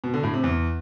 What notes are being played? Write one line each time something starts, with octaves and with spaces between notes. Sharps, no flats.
B2
D3
A2
C3
E2